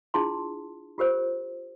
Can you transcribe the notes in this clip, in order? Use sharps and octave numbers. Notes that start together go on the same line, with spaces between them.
D4 E4 F4 G#4 A5 C6
F4 G4 A#4 C5